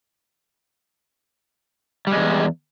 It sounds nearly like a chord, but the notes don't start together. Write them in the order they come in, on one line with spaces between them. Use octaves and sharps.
G3 G#3 E2